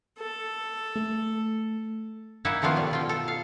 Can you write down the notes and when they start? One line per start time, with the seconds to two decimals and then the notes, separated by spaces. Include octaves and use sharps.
0.19 A4
0.96 A3
2.45 A#3 D#4 E4 E5 F#5 G#5
2.62 D#3 F3 A3 B3 F4
2.76 B2 G3
2.91 B2 F4 G5
3.09 A4
3.28 F5